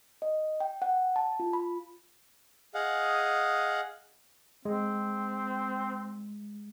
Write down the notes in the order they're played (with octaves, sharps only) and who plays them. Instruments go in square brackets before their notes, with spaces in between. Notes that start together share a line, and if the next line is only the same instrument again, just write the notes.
[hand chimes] D#5
G5
F#5
A5
F4
B5
[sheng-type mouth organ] G#4 D#5 F5 F#5
[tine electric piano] G#3 [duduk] C4